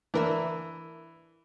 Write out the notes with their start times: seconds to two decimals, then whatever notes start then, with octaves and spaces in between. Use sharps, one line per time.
0.14 E3 D4 A#4 E5